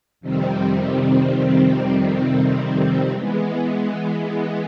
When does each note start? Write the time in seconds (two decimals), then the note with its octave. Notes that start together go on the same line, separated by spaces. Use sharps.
0.21 F2 C3 D#3 G3 C4
3.12 E3 G#3 B3